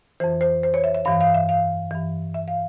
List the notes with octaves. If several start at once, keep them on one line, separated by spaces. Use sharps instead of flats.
F2 E3 C5
C5
C5
C#5
E5
E5
G2 E3 F5
F5
E5
F5
G2 E3
E5
F5